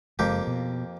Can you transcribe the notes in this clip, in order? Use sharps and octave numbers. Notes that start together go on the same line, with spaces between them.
F#1 F2 G#3 A#3 G4
B2